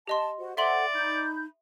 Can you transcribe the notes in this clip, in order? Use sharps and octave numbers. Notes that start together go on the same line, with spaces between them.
G4 D#5 A5 C6
F#4 C5
A4 C5 D5 E5 F#5 C6 F#7
D#4 B5 G6